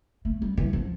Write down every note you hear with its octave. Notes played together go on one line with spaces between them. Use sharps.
A3
G3
E3
F3